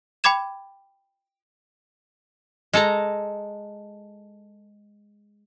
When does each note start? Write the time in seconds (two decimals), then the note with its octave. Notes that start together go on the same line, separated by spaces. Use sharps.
0.24 G5 B5 D6 G#6 E7
2.74 G#3 A4 A5 A#5